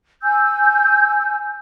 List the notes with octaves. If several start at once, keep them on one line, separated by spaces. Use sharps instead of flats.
G#5 E6 G6